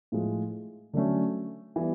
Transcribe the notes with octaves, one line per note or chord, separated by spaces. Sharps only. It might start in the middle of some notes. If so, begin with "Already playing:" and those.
A2 F3 G#3
D3 F#3 A3 C#4
E3 G3 B3